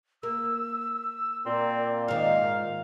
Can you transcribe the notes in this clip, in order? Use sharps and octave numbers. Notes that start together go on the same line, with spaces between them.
A#3 E6
A#2 C4 D5
G#2 D#3 F5